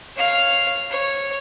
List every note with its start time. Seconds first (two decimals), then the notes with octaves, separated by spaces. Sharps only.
0.16 C#5 F5
0.90 C#5